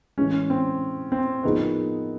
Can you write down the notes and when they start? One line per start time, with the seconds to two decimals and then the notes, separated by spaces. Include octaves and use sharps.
0.18 A2 E3 G#3 C#4
0.50 C4
1.12 C4
1.43 A2 F3 A#3 B3 D#4 G#4